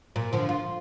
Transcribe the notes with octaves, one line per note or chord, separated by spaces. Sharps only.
A#2
D3 F3
F4